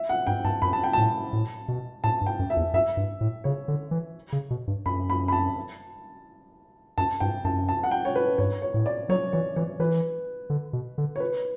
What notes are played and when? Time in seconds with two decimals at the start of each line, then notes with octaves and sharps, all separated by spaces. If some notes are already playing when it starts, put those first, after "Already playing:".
Already playing: E5
0.09 F#5
0.27 G2 G5
0.44 G2 A5
0.62 F#2 B5
0.73 A5
0.84 G5
0.93 A2 A5
1.33 A2
1.68 B2
2.04 A2 A5
2.21 G2
2.26 G5
2.39 F#2
2.50 E5
2.57 E2
2.73 F#2 E5
2.97 G2
3.21 A2
3.44 C#3 C#5
3.68 D3
3.91 E3
4.32 C#3
4.51 B2
4.68 G2
4.86 F#2 B5
5.10 B5
5.28 B5
5.33 A5
6.98 F#2 A5
7.20 G2 G5
7.44 F#2 A5
7.69 A5
7.83 F#5
7.91 G5
8.05 C#5
8.16 B4
8.38 G2 C#5
8.62 C#5
8.74 A2
8.86 D5
9.09 F#3 C#5
9.33 E3 C#5
9.56 E3 C#5
9.79 E3 B4
10.50 D3
10.73 B2
10.98 D3
11.16 C#5
11.20 B4